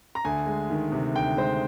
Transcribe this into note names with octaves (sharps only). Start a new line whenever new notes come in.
A#5
D2 G#5
G#3
D#3
C3
D2 G5
G#3 C5